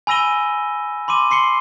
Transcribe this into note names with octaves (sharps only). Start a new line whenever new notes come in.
G#5 B5 E6 A#6 D#7 G7
B5 C6 D6 D#7
C6 C7 C#7 G7